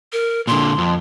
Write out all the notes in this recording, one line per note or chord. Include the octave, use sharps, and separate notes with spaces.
A#4
A#2 D3 C6
F2